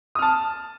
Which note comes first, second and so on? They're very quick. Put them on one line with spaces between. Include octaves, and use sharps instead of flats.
D#6 F6 A5